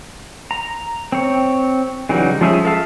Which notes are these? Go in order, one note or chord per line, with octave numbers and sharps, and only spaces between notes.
A#5
C4 C#5
C#3 E3 F#3 G3 D#4
F3 G#3 C#4 G#4 E5
A4 E5 F5 A5